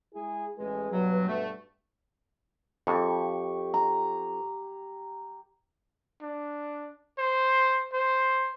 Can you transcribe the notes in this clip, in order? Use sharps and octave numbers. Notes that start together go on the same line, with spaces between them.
G#3 E4 G#4
A1 G#3 G#4 B4
G2 B2 F#3
A3
F2 G4 C#6
A#5
D4
C5
C5